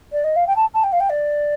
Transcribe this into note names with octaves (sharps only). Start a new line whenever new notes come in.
D5
D#5
F5
G5
A5
A5
G5
F5
G5
D5